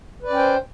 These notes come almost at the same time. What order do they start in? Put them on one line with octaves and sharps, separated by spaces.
B4 D5 C#4 G5 C5